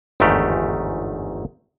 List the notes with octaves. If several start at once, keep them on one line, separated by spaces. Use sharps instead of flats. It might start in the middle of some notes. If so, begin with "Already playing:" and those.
G1 E2 G#2 D#3 A3 G4